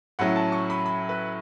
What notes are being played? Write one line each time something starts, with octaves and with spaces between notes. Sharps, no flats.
A2 F#3 C#4 E4 F#5
A5
C#6
B5
B5
B4